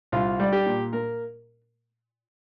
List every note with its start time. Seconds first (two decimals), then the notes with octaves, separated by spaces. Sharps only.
0.12 C2 F4
0.40 G3
0.53 G4
0.66 A#2
0.93 A#3 A#4